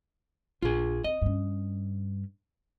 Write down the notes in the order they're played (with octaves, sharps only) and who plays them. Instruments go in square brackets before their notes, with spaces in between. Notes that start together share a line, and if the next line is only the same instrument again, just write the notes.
[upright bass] A#1 [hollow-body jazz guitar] F4 G#4
[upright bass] C4 [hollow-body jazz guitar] D#5
[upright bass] G2 C#4